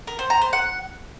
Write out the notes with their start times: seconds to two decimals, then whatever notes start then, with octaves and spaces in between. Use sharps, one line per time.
0.07 A#4
0.19 C5
0.30 A#5
0.41 C5
0.53 F#5